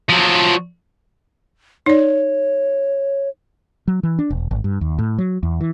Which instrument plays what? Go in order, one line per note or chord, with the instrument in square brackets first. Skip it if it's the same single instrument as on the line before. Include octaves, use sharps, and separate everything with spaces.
[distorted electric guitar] F3 F#3
[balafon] D#4 D5 [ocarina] C#5
[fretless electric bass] F#3
E3
D4
E1
G#1
G2
D#2
A2
F#3
E2
E3